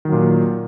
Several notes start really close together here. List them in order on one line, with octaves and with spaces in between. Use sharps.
D#3 F#3 A#2